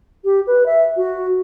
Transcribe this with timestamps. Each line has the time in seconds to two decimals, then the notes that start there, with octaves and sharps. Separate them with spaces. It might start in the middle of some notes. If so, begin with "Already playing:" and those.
0.24 G4
0.47 B4
0.66 E5
0.96 F#4